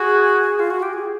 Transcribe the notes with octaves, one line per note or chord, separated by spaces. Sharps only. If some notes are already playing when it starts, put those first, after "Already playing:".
Already playing: F#4 G#4
F4
F#4
G4
G#4